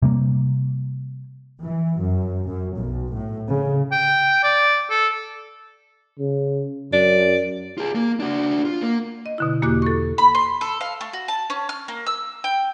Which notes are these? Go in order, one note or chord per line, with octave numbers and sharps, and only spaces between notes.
C3 G3 A#3
E3
F#2
F#2
B1
A2
C#3
G5
D5
A4
C#3
F#2 D5
F4 G#4
A#3
D4 F#4
F4
A#3
D#5
B2 D3 E4
E2 A#3 F#4 G4 D6 F#6
A4 C#6
B5
C6
A4
F5
A3
F#4
A5
C#4
F6
A#3
E6
G5